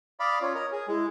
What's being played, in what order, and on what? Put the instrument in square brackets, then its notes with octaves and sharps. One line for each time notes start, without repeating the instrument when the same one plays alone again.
[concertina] D5 F5 B5 [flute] D#6
[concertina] C#4 F4 [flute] C#5
[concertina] A#4 D#5
G#4
[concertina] G#3 [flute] E4